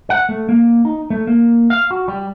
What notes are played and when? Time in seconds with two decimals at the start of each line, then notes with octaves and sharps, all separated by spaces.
0.10 F#5
0.29 A3
0.49 A#3
0.85 D#4
1.10 A3
1.27 A#3
1.70 F5
1.91 F#4
2.08 G3